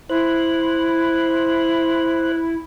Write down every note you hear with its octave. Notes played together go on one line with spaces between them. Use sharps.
E4 C5 F#6